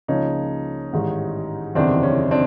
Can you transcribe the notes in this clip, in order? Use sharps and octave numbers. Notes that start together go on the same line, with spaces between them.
C#2 C#3 F3 A#3 C#4 D#4
A1 G#2 D#3 G3
F#1 E2 C3 D#3 C4 D4
C#4
C4 D4